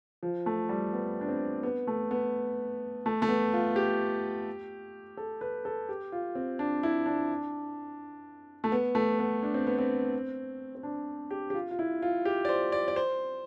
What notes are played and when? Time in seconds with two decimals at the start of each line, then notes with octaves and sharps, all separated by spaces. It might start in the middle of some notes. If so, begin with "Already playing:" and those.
0.23 F3
0.46 A3
0.69 G3
0.93 B3
1.21 D4
1.28 C4
1.63 B3
1.87 A3
2.11 B3
3.06 A3
3.22 A3
3.29 B3
3.53 F4
3.76 G4
5.17 A4
5.41 B4
5.65 A4
5.89 G4
6.12 F4
6.35 C4
6.59 D4
6.83 E4
7.06 D4
8.64 A3
8.72 B3
8.95 A3
9.19 B3
9.43 D4
9.54 C4
9.67 B3
9.78 C4
10.75 C4
10.83 D4
11.31 G4
11.50 G4
11.54 F4
11.71 F4
11.79 E4
12.02 F4
12.25 G4
12.45 D5
12.49 C5
12.72 D5
12.88 D5
12.96 C5